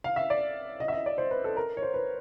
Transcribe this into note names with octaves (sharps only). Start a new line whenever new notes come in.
F5
E5
D5
D#5
E5
D#5
D5
C5
B4
A4
A#4
C#5
C5
B4